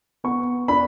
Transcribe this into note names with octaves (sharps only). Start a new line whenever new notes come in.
B3 C#6
D4 B5